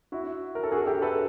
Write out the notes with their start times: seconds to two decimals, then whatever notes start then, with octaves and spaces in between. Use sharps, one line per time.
0.12 E4 F#4
0.55 A#4
0.63 A4
0.72 F#4 G#4
0.86 G4 A4
1.02 A4 B4